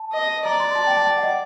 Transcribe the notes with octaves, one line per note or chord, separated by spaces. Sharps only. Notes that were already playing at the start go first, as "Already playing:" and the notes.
Already playing: A5
D#5
D5 A#5
C6
A5
G5
A5
G5
F#5
D#5